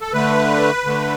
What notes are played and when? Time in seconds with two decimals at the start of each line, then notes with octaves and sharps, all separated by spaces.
0.01 A4
0.13 D3 A3 B4
0.85 D3 A3